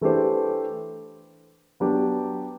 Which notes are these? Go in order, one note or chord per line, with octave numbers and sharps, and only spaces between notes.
E3 A3 D4 G4 C5
F#3 B3 D4 G4